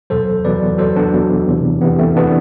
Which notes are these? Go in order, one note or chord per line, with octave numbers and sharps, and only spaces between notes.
E2 B2 F#3 A4 C5
E2 B2 F#3 B4 D5
E2 B2 F#3 A4 C5
B3 D4
E2 B2 F#3
E2 C3 E3
E2 C3 E3 B3
A3 C4
C3 E3 B3 D4